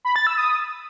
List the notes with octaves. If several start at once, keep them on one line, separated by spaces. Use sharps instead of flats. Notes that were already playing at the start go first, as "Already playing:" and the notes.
B5
A6
E6
D#6